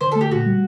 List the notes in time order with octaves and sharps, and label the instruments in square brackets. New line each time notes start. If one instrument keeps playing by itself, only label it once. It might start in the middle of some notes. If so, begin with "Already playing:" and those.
[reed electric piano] D3 [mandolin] C5
[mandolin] A4
[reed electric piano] A3
[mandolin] G4
[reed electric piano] A#2 [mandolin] F#4
[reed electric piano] G3